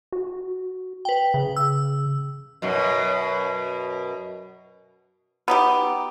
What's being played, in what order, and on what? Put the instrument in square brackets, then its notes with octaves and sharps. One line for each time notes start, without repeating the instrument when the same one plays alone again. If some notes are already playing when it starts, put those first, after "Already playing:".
[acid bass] F#4
[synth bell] B4 G5
[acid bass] C#3
[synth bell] E6
[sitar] F#2 B2
[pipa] B3 D#4 G4